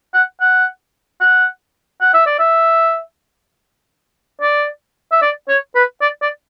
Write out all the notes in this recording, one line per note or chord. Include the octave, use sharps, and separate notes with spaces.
F#5
F#5
F#5
F#5
E5
D5
E5
D5
E5
D5
C#5
B4
D5
D5